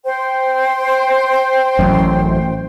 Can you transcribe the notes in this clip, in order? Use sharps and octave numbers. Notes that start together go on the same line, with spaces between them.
C5 G5
A1 F#2